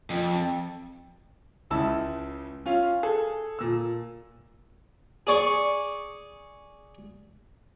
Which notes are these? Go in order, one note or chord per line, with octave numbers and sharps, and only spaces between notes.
F2
C#2 C#3 E4 A5 E6
C#4 F4 F5
G#4 A4
A#2 E6
G#4 D5 C#6